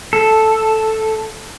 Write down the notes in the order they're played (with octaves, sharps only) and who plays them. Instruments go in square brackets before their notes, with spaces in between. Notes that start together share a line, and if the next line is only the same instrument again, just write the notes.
[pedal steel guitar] A4